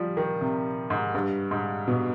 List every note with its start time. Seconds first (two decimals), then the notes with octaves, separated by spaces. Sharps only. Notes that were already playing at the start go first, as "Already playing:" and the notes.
Already playing: F3 G3
0.17 D#3
0.41 C3
0.90 G#2
1.15 G2
1.51 G#2
1.88 B2